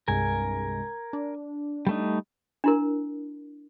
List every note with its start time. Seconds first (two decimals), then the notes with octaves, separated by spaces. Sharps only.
0.08 C2 G2 G#3 A#4 G#5
1.13 D4
1.87 G3 A3 D#4
2.64 D4 E4 A#4